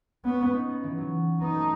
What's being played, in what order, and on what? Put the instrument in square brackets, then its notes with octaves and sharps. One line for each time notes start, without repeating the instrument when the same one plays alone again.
[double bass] B3 [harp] C#4
[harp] D#4
B3
E3
F#3
[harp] B3 [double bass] D#4
[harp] A3